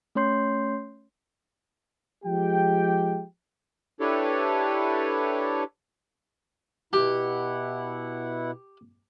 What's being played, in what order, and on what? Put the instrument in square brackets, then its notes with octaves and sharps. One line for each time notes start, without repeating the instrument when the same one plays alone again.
[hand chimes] A3 C#4 C#5 C6 G6 C7
[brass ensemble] F3 G#3 G4 G5
[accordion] D4 E4 G4 A4 B4 C#5
[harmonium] B2 E4 F#5 [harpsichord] G4